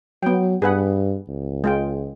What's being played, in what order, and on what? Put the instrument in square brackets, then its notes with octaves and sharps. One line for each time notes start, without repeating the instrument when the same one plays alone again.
[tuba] F#3 [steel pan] B3 G5
[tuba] G2 [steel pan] G#4 B4 F#5
[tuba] C#2
[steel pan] G#3 F4 G5